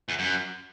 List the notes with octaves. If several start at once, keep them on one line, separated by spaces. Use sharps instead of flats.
E2
F#2